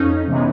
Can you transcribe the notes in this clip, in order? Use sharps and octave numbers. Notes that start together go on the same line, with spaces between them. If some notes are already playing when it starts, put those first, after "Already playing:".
Already playing: F2 C#4 D#4
C3 E3 G#3 B3